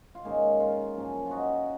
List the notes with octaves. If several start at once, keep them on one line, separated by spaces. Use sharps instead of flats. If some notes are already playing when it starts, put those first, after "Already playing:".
F4
G#2 D#3 A#3 C#4 D#4
F4
F#2 F3 A#3 C#4
F4
D#4 F#4